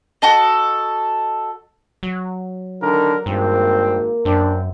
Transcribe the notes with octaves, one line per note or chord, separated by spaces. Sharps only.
F#4 A4 D#5
F#3
D3 D#3 A#4
G#1 G2 A#3 C4
F#2 C4 D4